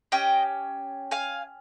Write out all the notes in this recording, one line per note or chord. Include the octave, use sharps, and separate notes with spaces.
C#4 G4 D#5 G5
F5 G#5